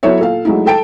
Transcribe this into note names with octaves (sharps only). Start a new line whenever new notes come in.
F#3 B3 E4 A4 C#5 E5
A#2 A4 F5
F#3 G#3 A3 D#4 E4
A4 G5 A5 D7